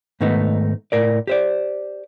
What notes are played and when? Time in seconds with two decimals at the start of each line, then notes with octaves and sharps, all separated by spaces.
0.21 G#2 D#3 A3 B3 D#4
0.92 A2 A#4 D5
1.27 G4 C5 D5